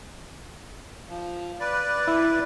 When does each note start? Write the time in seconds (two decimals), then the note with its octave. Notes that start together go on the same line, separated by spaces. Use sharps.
1.08 F3
1.60 B4 D5
2.08 E4